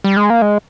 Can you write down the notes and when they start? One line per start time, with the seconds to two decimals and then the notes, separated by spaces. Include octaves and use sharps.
0.04 G3
0.17 G#3
0.30 A#3
0.42 G#3